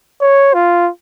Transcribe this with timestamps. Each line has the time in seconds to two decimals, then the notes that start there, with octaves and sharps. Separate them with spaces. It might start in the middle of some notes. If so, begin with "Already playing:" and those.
0.21 C#5
0.54 F4